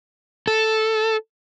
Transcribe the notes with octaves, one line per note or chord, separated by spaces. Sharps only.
A4